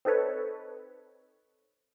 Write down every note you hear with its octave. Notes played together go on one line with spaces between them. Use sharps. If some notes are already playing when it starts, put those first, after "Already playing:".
C4 D#4 A4 B4 C#5